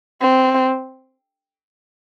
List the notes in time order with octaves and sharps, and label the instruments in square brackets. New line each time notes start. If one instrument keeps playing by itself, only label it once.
[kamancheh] C4